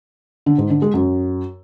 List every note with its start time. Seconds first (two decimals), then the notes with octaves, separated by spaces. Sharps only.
0.46 D3
0.58 G#2
0.70 D3
0.82 G#3
0.94 F#2